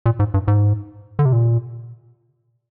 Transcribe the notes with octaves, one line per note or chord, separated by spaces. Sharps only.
A#2
G#2
G2
G#2
D3
C3
A#2